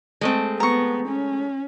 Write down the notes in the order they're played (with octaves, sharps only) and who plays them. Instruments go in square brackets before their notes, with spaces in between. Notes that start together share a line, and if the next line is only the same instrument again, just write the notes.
[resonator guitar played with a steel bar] G#3 A3 C4
[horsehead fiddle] B3 [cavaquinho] A#5 C#6
[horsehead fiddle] C#4